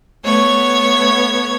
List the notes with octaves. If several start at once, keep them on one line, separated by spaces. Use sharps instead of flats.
A3 B3 C#5 G#6